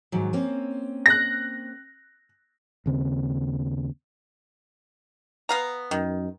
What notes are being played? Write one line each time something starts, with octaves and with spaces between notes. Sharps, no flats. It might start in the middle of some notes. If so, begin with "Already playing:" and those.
G#2 D#3 F#3
A#3 C4 C#4
F#6 A#6
D#2 C#3 C4
B3 F5 A#5
F#2 D#3